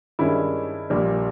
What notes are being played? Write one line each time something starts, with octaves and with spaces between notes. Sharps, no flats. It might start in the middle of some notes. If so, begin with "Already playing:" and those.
G2 D#3 G#3 C#4 E4
A#1 A#2 G3